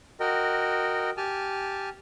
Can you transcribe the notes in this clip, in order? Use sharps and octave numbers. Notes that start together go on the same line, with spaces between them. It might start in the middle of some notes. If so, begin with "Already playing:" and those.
F#4 A#4 D#5 G5
G4 G#5 A5 F6